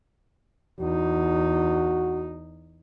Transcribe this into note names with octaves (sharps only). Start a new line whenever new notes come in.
E2 D#4 F#4